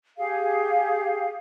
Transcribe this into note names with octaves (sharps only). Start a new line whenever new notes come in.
G4 G#4 F5